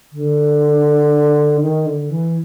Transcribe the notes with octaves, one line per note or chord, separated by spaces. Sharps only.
D3
D#3
D3
E3